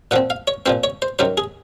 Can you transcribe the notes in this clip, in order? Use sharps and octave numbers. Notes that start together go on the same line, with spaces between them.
A#2 F3 C4 F#5
F5
C#5
A#2 F3 C4 C5
C#5
C5
F#2 D#3 F#3 C5
G#4